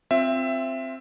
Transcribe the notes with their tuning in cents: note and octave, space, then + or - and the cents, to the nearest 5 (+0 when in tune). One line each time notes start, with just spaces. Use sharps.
C4 +0 F4 +15 E5 +15